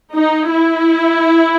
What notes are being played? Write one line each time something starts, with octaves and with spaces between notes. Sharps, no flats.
D#4
E4